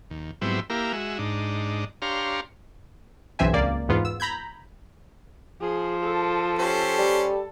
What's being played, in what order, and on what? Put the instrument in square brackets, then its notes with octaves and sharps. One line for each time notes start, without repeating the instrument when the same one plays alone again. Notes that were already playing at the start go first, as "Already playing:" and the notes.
[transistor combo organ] D#2
G#2 F#3 G3 B3 C4 E4
A#3 E4 G4 A#4 F5
G#3 F#4 E5
G#2 D4 D#4
D4 G4 C#5 F5 A#5 C6
[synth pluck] B1 G2 E3 C4 E5 G#5
C#2 A#3 D5
E2 G#2 B3 F4
E6
A#5 B5 G6 G#6
[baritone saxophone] F3 [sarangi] G#4
[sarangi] A4
[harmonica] C#4 G4 C5
[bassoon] G3